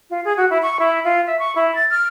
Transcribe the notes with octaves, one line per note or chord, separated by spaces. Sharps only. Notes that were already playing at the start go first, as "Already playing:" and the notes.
F4
G#4
F#4
E4
C#6
E4
F4
E5
C#6
E4
A6
F6